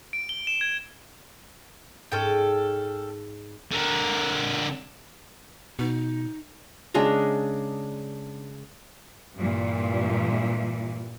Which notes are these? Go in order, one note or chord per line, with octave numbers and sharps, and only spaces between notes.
D7
G7
E7
G#6
G#2 C#4 A4 G5
D3 A#4
B2 D#4
C#3 G#3 D4 A#5
G2 A#2 E3